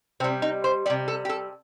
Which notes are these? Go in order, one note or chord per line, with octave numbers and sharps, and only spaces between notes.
C3 G3 C4
D#4
C5
C3 G3 D5
A4
G4
A4